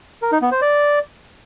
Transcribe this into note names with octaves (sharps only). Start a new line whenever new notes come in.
A#4
D#4
B3
C5
D5